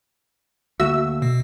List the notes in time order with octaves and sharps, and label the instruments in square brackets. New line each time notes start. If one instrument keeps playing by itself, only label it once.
[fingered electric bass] D2 A3 A#3 [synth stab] F#4 E5 E6
[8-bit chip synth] B2